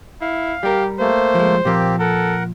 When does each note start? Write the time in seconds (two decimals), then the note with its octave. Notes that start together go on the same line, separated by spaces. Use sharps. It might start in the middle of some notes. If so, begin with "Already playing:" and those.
0.21 E4 F5
0.63 G3 G4 A#4
1.00 A3 A#3 C5
1.35 F3 G#3
1.65 A#2 F3 A#3 C4 G4
1.99 A4 A#4 F#5